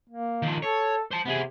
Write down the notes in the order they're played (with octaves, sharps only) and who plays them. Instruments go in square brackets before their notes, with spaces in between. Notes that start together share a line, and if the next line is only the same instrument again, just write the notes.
[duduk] A#3
[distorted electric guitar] D#3 F3
[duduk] A4 [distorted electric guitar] C#5
[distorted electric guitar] C5 A5
[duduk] C3 [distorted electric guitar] B3 G#4